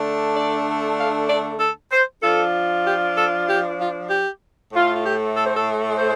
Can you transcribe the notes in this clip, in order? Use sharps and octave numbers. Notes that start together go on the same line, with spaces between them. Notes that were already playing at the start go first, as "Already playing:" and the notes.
Already playing: D3 A3 D4
D5
F5
D5
A4
C5
F3 D4 F4 A4
G4
A4
G4
F4
G4
A2 A3 F4
F4
G4
A4
C5
A4
C5